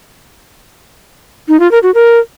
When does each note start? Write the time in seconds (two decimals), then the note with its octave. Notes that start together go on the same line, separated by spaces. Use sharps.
1.48 D#4
1.60 F4
1.71 A#4
1.83 F#4
1.94 A#4